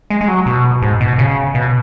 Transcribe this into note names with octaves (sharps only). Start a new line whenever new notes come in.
G#3
G#3
F#3
B2
G#2
B2
C#3
B2